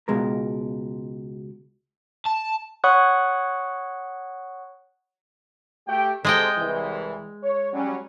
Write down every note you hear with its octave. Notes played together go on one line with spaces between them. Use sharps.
C#2 B2 G#3 A#4
A5
C#5 F#5 B5 C#6 D#6 F#6
A3 G4 G5
C3 G#3 A4 C5 D#5 G5
C2 E3
C#5
F#3 G3 C#4